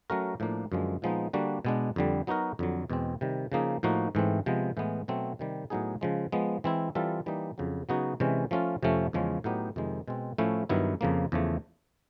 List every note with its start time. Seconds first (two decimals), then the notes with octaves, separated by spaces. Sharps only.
0.10 F#3 A3 C#4 F#4 A#4
0.40 A2 F3 A#3 D4
0.72 F#2 D3 F3 G#3
1.02 A#2 F3 G#3 B3 D#4
1.33 D3 G3 A#3 D4 F#4
1.65 B2 G#3 B3 D4
1.96 F2 D3 G3
2.27 F#3 B3 D#4 F#4 A#4
2.59 F2 D3 F#3
2.90 E2 B2 G#3 C4
3.21 C3 D#3 G3
3.52 C#3 F3 A#3 D#4 G#4
3.83 A2 F3 A#3 D#4 F#4
4.15 G#2 E3 A3 C4
4.46 C3 F3 G#3 B3
4.77 A2 E3 G#3 B3
5.08 B2 F#3 A3 C4
5.39 C3 D#3 G3
5.70 A2 F#3 B3 D#4 G#4
6.01 C#3 F3 G#3
6.32 F3 G#3 B3
6.64 E3 G#3 C4 E4
6.95 E3 G3 C4 F4 A4
7.26 E3 G3 A#3 D#4
7.58 F2 C#3 F#3
7.89 C#3 F#3 B3 D#4 F#4
8.20 C3 E3 G#3 C#4
8.51 F3 A3 C#4 F4
8.83 F2 C3 F3 A3 C#4
9.13 E2 C#3 F3 G#3 C#4
9.44 A2 F#3 B3 D#4 G4
9.76 F2 C3 D#3 G#3
10.08 B2 G#3 C4
10.38 A2 F3 A3 C#4 E4
10.69 G2 D#3 F#3 B3 E4
11.01 F2 C#3 F3 A#3
11.32 E2 C#3 F3 A3